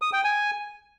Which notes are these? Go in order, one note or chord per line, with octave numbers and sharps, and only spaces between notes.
D#6
G5
G#5